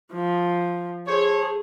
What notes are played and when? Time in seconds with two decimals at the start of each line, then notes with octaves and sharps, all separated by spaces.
0.12 F3
1.08 G#4 A4 C5 C#5